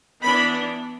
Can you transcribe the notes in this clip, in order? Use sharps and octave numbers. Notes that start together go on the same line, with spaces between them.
E3 B3 D4 B5